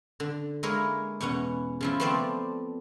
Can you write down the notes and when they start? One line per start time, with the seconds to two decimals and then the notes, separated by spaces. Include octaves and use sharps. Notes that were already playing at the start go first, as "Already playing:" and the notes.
0.20 D3
0.63 G#3 A#3 E4 A#4 C#5
1.21 E2 B2 C#4 F#5
1.81 C#3 F3 E4
2.00 F3 A3 B3 C4 C5 D5